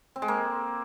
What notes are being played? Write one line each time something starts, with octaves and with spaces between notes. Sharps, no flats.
C4
G#3
A#3